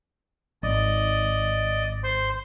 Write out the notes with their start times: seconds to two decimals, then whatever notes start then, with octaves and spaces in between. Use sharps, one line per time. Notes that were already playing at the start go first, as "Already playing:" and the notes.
0.63 G#1 D5 D#5
2.04 C5 C6